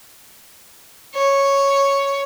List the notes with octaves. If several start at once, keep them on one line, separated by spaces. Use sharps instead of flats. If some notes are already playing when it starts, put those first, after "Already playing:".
C#5